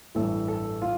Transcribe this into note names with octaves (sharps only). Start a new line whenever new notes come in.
A1 G2 E3 A4
A4
F4